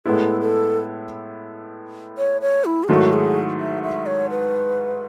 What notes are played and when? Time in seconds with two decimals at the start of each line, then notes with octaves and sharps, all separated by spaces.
0.05 A2 G#3 B3 E4 A4
0.41 A4
2.18 C#5
2.41 C#5
2.65 E4
2.84 G#4
2.88 G#2 D#3 F#3 A3 E4 F#4
3.13 G#4
3.60 E5
3.83 E5
4.06 C#5
4.30 B4